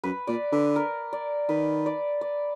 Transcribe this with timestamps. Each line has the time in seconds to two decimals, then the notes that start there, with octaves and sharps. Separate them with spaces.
0.04 F#2 B4
0.27 A#2 D5
0.52 D3 B4
0.76 A#4
1.13 D5
1.49 D#3 B4
1.86 D5
2.21 D5